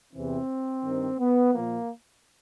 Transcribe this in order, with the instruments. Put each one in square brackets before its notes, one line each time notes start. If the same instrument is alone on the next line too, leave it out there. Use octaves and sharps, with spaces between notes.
[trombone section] E2 C3 E3 C4
G2 D#3
B3
A#2 F3 A#3